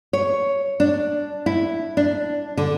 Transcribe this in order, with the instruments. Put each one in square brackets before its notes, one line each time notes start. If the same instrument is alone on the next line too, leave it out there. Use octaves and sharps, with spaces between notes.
[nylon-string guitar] C#5
D4
E4
D4
D3